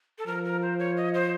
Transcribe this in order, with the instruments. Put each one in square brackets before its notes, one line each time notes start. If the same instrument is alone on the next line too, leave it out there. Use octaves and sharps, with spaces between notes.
[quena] A4
[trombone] F3 [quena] A#4
[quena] A#4
C5
C#5
D#5
C5